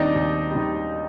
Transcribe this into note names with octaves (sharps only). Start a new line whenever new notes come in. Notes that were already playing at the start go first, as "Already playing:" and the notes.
Already playing: D#2 D#3 G3 C4 D4 D#4 D5 D#5
D#2
D#3 G3